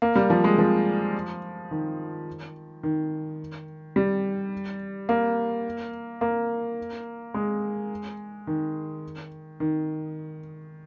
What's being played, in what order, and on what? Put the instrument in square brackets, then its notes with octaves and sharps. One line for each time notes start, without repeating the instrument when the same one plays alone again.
[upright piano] A#3
G3
F3
G#3
F3
D#3
D#3
G3
A#3
A#3
G#3
D#3
D#3